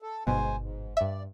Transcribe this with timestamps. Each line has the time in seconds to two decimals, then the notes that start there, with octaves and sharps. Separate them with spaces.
0.02 A4
0.27 G1 G#2 B2 C5 G#5
0.60 G#2
0.97 G2 D5 E5